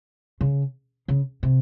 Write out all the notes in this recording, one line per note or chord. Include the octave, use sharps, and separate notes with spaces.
C#3
C#3
C3